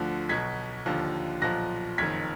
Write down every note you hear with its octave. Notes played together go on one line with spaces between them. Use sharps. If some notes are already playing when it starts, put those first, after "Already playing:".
Already playing: D2 D3 F3 F#6
B1 B2 G#6 B6
D#2 D3 F3
B1 A#2 F3 F#6 A#6
F#1 F2 D#3 G#6 B6